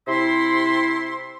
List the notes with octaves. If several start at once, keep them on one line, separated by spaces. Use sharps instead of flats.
C3 E4 C6